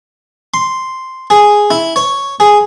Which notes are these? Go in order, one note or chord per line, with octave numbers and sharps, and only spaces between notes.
C6
G#4
E4
C#5
G#4